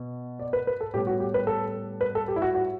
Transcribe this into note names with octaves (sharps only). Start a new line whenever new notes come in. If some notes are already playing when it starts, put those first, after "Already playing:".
Already playing: B2
D5
B4
B4
A4
A2 G3 B3 G4
F#4
G4
B4
A4
B4
A4
G4
E4
F#4
F#4